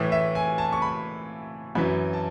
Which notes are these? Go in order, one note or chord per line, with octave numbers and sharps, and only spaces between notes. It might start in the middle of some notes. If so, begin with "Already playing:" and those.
Already playing: A2 E3 E5
E5
G#5
A5
C#6
B5
F#2 E3 B5
A5